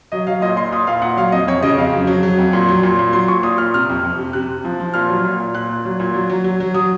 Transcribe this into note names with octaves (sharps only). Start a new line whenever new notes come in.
F#3 D#5
F#3 F5
A#2 D#5
A#2 C6
A#2 D#6
A#2 F5
A#2 F#5
F#3 F5
F2 D#5
F2 C#5
C#3 D#5
F2 F5
F#3
F#3
F#3
F2
A#2
F#3
A#2
A#2
F#3 C6
A#2 C#6
A#2 D#6
A#2 F6
C3 F6
F2
F2
C3
C3 F#6
C3
F3
F3
A#2 F6
F#3
A#2
A#2
A#2 F#6
A#2
F#3
A#2
F#3
F#3
F#3
F#3
F#3 D#6